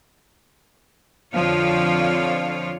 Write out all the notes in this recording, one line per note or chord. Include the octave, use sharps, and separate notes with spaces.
F2 D3 F3 F4 C#5 F5